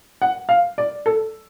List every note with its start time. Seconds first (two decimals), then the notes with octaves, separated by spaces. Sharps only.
0.22 F#5
0.49 F5
0.78 D5
1.06 A4